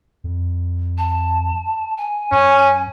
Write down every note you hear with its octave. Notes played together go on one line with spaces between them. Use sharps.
F2
A5
G#5
F#2 C#4